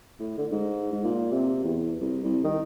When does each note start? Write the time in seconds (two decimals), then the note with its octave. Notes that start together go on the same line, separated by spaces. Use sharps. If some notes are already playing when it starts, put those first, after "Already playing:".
0.19 A2
0.38 D3
0.52 G#2
0.92 G#2
1.04 A#2
1.32 C3
1.64 E2
2.00 C2
2.24 C2
2.44 D#3